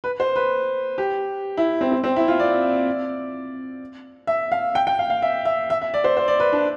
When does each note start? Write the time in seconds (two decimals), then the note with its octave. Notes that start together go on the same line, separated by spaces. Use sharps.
0.04 B4
0.20 C5
0.36 B4
0.98 G4
1.57 E4
1.81 C4
1.92 C4
2.04 C4
2.16 E4
2.28 F4
2.40 D5
4.27 E5
4.52 F5
4.75 G5
4.87 G5
4.99 F5
5.10 F5
5.22 E5
5.45 E5
5.70 E5
5.82 E5
5.94 D5
6.04 C5
6.17 C5
6.28 D5
6.40 B4
6.52 D4